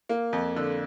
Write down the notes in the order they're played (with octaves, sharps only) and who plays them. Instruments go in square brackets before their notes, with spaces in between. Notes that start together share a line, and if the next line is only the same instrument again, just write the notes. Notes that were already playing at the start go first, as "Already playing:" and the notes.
[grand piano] A#3
F2
D3